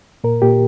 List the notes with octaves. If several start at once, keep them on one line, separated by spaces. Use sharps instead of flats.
A#2 A#4
A#2 G4